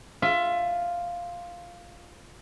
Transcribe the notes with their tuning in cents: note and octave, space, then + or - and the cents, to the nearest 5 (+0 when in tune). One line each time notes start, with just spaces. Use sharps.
F4 +0 E5 +20